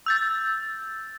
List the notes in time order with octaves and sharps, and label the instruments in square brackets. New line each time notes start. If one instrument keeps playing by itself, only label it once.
[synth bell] E6 G6 A6